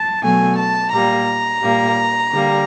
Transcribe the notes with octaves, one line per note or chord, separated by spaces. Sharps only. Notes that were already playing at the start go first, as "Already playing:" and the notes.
Already playing: A5
B2 F#3 A3 G#5
A5
A#2 G3 A#3 A#5
A#2 G3 A#3
D3 G3 A#3